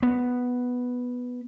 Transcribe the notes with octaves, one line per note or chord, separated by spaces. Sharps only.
B3